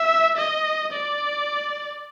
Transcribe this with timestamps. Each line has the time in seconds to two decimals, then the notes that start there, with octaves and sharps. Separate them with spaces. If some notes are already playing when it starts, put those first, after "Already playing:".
Already playing: E5
0.37 D#5
0.92 D5